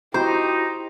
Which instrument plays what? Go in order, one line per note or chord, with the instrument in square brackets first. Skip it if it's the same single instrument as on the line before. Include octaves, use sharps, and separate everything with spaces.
[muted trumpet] D#4 [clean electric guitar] E4 F#4 A#5 [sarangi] G4 [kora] C5